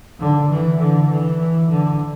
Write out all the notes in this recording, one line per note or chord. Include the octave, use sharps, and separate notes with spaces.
D3
E3
D3
E3
D3